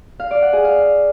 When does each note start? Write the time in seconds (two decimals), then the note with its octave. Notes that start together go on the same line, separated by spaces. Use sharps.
0.20 F5
0.31 D5
0.42 F#5
0.53 G#4
0.64 F5